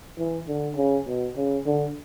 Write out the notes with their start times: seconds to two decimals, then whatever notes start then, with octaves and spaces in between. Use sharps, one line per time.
0.18 E3
0.48 D3
0.77 C#3
1.07 B2
1.37 C#3
1.66 D3